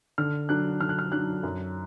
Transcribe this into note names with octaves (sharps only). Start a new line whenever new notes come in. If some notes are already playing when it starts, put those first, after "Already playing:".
D3 F6
F#3 D4 F#6
D3 F6
F#6
F6
F#3 D4 F#6
F#2